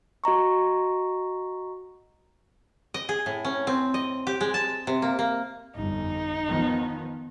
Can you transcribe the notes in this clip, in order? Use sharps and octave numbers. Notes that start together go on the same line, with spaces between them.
F#4 D#5 A#5 C#6
D#5
G#4
A2
C#4
C4
D#5
G4
G#3
A5
C3
A#3
A#3
G1 F2 D#4
D#3 F3 B3